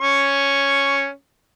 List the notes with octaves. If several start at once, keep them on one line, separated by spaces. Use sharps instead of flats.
C#4 C#6